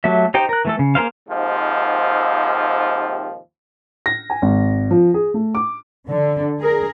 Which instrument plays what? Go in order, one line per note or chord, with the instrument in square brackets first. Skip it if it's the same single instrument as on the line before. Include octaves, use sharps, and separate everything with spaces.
[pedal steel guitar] F#3 A3 G4 E5
D#4 G4 C5 G5
A#4 F#6
E3 A3 A4
C#3
A#3 G#4 A#4 C5 F5
[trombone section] D#2 G#2 C3 D#3 F3
[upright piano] A#6
G#5
G#1
F3
G#4
A3
D6
[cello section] D3
G#4 A#4